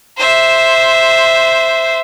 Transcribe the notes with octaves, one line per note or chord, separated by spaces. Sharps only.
C5 E5